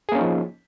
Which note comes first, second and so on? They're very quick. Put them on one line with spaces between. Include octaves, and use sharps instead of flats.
G#4 A#3 C#4 D#4 F3